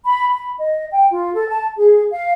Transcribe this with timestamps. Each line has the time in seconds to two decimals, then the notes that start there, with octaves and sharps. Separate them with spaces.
0.04 B5
0.32 B5
0.58 D#5
0.91 G5
1.10 F4
1.34 A4
1.49 A5
1.76 G#4
2.10 F5